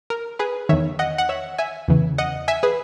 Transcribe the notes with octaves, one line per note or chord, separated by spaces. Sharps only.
A#4
G#4 B4
E2 D#3 C#5 E5
D#5 F#5
F#5
C#5 E5
E5 G#5
E2 C#3 E3
D#5 F#5
E5 G#5
G#4 B4